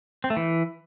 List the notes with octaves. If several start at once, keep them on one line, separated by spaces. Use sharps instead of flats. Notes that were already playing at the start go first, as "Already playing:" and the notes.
C4
A3
E3